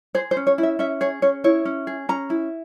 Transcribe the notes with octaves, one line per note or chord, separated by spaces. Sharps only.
G#4 C5
C5
C#4
C#5
E4
E5
C#4 E5
G#4 C#5
C#4 C#5
E4 C#5
C#4
G#4
C#4 A#5
E4